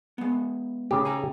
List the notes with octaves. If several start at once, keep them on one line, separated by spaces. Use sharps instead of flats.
G#3 B3
A2 C#3 G4
G#4 G#5 A#5